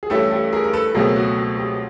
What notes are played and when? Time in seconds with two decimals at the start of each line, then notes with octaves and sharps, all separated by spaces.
0.03 G#4
0.10 G2 E3 A3 C#4 E4 G4 A4
0.31 G4 A4
0.53 G#4 A#4
0.64 A#4
0.73 A4 B4
0.95 C#2 B2 F#3 A3 C4 G#4 A#4
1.16 F#4
1.37 F#4
1.58 G4